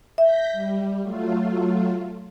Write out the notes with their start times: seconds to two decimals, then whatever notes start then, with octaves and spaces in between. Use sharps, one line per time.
0.18 E5 G6 A#6 B6
0.52 G3
1.02 F#3 A3 F4